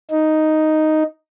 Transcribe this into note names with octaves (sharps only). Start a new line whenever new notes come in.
D#4